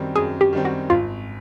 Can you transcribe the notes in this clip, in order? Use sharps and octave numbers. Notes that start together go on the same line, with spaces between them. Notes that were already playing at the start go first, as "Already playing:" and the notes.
Already playing: F#2 D#3 G3 C4
F#2 G#4
G4
D#3 G3 C4
F#4
G#1 F4